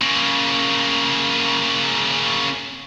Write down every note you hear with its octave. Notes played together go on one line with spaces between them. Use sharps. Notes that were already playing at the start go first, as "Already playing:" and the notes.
C#3 A#3